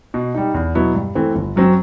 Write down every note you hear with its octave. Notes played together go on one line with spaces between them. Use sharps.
B2
G3 D#4
E2
B2 F#3 B3 E4
G2
E3 A3 C4
G1
F#2 F#3 C4